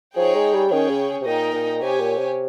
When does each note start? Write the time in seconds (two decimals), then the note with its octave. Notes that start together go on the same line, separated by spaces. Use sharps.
0.16 F3 D#4 G#4 C#5 G5
0.35 G#3
0.53 G3
0.71 D#3 C#4 G#4 C#5 G5
0.89 C#3
1.21 C3
1.25 A#2 D#4 A#4 D#5 G5
1.53 A#2
1.81 C3 G4 C#5 G#5
1.99 A#2
2.17 C3